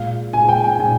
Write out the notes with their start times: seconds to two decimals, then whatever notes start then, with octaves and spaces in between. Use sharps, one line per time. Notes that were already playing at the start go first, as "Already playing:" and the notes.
Already playing: A#2 G#3 F5
0.33 A#2 G#3 G#5
0.49 G5
0.64 G5
0.79 A#2 G#3 G#5